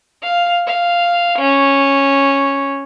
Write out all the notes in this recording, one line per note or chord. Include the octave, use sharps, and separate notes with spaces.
F5
F5
C#4